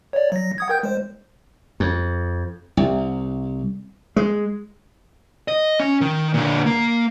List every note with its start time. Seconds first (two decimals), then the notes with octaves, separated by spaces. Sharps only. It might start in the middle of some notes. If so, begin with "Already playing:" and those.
0.13 C#5 D5
0.32 F#3 A#6
0.58 F#5 D#6 G#6
0.69 A#4 G5 G6
0.83 G#3 C5
1.80 F2
2.77 C2
4.16 G#3
5.48 D#5
5.80 C#4
6.01 D#3
6.34 A#2 D3
6.66 A#3